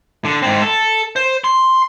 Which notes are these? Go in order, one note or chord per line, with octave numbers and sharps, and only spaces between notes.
D3
G#2 C4
A4
C5
C6